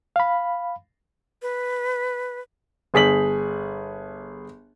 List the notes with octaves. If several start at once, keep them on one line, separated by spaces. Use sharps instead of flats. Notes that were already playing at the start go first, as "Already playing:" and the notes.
F5 B5
B4
G1 G#4 B6 F#7